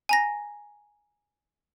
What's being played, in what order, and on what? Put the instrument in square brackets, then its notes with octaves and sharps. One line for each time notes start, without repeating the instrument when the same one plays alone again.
[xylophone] G#5 A#5 A#6